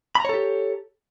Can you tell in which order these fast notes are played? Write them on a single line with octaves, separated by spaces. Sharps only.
B5 A#5 C#5 A4 G4